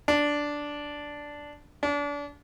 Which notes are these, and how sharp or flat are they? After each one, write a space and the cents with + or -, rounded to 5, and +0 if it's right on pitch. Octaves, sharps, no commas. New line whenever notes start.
D4 -5
D4 -30